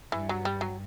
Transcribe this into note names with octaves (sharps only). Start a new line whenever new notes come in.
G2 E3
F#3
G3
F#3